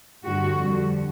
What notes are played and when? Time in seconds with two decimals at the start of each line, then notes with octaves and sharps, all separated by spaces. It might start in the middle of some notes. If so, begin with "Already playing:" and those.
0.25 G2 D3 G3 F#4
0.57 F2 D3 G3